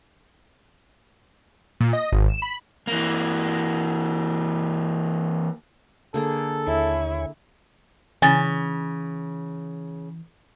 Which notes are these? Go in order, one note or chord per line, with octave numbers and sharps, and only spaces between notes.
A#2
D#5
G#1
E7
B5
E3 A#3
D3 A#3 G#4 A4
D#2 E4 C#5 G#5
C#3 E3 G#5 A6